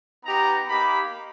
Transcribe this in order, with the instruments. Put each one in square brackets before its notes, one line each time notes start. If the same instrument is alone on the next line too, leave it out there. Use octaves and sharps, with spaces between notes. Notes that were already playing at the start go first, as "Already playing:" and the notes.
[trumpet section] B3 D#4 G4 A#5
A#3 D#4 G4 B5